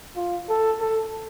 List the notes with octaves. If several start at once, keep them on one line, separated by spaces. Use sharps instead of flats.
F4
A4
A4